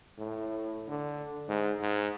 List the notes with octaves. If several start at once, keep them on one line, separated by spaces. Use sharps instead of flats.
A2
D3
G#2
G#2